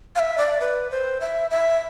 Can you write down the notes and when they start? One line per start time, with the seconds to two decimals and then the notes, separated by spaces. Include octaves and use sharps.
0.16 F5
0.19 E5
0.38 D5
0.61 B4
0.91 C5
1.21 E5
1.50 E5